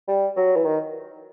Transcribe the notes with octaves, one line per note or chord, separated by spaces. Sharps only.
G3
F#3
E3
D#3